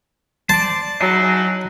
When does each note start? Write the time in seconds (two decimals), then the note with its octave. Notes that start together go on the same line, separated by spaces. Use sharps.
0.49 C5 D5 A5
1.01 F#3 D#4 E4 G#4